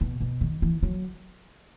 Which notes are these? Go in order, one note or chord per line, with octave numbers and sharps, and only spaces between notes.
B2
B2
D#3
E3
F#3